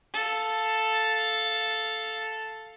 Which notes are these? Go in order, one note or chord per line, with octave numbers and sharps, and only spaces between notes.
A4 F5